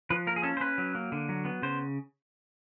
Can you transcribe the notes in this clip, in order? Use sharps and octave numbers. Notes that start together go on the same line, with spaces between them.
F3 B4
A#3 A#4
G#4
C#4 A4
C5
C#4 B4
F#3
A#3
D3
F#3
B3
C#3 C5